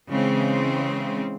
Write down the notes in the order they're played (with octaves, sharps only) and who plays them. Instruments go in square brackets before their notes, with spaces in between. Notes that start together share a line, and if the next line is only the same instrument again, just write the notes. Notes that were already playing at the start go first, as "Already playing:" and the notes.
[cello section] C#3 E3 G#3 C4